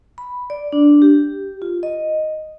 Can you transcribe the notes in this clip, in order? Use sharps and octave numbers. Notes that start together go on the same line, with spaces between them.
B5
D5
D4
G4
F4
D#5